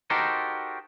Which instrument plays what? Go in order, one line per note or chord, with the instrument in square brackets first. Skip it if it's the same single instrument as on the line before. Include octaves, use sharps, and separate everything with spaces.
[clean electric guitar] D#4 F#4 G4 A4 A#4 C5